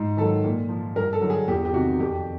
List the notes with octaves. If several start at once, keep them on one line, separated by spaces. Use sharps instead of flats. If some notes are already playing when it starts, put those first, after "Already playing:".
Already playing: G#2
D#3 F#3 A4
A#2
F3
G2 A#4
A4
D3 F#3
G#4
E2 G4
G4
C3 D#3 F#4
F2 G4